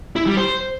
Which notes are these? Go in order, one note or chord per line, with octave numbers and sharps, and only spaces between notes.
E4
G3
C5